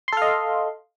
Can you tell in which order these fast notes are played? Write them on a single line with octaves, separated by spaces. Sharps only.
C6 A4 F5 D#5